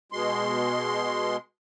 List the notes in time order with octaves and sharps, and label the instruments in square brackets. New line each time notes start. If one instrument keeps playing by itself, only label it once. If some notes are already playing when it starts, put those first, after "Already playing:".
[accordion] B2 G#3 C6